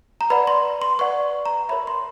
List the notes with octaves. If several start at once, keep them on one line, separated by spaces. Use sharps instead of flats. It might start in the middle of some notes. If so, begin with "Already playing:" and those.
A#5
B4 D5 F#5 B5
C6
C6
B4 D5 F#5 C#6
A#5
A#4 C#5 E5 B5
C6